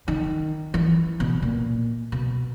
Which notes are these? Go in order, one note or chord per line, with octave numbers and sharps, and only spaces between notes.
D#3
E3
B2
A#2
B2